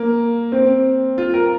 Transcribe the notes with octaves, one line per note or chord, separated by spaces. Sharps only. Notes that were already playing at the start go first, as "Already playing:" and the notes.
Already playing: A#3
C4
F4
A#4